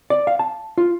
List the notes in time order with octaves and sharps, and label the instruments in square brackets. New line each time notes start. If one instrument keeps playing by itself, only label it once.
[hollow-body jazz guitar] D5
F5
A5
F4